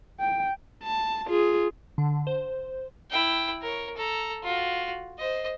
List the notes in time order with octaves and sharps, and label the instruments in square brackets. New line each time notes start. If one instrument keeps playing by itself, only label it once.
[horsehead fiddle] G5
[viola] A5
F4 G#4
[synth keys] D3
C5
[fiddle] E4 G5
A#4 C#5
A4 A#5
F4 F#4
C5 D#5